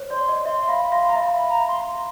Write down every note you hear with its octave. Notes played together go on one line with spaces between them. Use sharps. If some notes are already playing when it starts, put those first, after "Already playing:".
Already playing: C5 C#5
D5 C6
D#5
E5 C6
F5 B5
F5 C6
F5 A#5
E5 B5
B5
A#5
C6